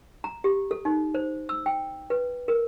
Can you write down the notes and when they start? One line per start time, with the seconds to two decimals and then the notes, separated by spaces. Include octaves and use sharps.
0.24 A#5
0.44 G4
0.71 A4
0.85 D#4
1.14 C5
1.49 E6
1.66 G5
2.10 B4
2.48 A#4